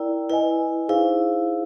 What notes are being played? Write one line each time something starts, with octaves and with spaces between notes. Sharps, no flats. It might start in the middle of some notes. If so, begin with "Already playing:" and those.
Already playing: E4 A#4 D5 G5 A#5
E4 B4 D#5 G#5
D#4 E4 G#4 C5 F5